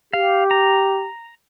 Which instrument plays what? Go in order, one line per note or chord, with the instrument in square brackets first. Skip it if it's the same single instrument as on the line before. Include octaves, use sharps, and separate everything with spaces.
[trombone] G4 [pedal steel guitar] F5
[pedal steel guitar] A#5